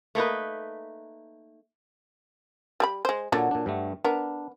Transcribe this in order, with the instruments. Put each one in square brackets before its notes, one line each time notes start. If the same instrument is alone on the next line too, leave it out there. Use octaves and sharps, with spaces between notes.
[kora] A3 A#3 D#4 B4
[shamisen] G3 G#4 B5
G#3 C5
[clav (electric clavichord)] A#2 D5 A5 [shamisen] D3 F#3
[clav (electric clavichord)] A#2 D4
G2 G3 A3
[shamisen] B3 A#4 [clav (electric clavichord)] D4